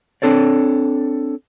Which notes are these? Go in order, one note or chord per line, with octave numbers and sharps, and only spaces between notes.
C4 D4 A4 C#5 D5